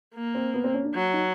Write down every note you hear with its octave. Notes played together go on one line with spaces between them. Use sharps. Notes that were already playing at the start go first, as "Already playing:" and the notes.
A#3
C4
B3
C4
C#4
D4
F#3
D#4